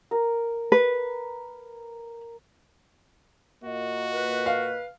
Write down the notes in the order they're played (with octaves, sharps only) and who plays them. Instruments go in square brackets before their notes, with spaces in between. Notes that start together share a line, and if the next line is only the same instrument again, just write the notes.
[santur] A#4
[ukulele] B4
[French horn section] A#2 A#3 D#5 [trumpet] F#4
[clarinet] B4
[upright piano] F5